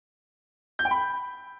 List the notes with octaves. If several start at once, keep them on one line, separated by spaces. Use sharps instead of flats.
G6
G5
B5